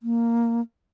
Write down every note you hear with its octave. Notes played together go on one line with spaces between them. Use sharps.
A#3